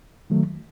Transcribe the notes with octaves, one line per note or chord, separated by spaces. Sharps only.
D#3 F#3 A3